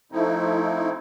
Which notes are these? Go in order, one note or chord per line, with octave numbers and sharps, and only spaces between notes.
F3 A3 C4 D#4 E4